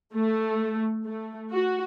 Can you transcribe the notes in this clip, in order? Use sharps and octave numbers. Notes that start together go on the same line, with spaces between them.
A3
A3
F#4